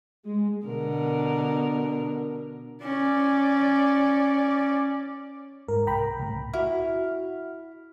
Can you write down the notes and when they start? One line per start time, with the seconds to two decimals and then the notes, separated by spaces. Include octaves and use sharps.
0.25 G#3
0.65 B2 D3 A#4
2.82 C#4 D5
5.68 G#2 A#4
5.87 C2 G5 A#5 B5
6.19 C#2 A2
6.53 E4 F#4 F6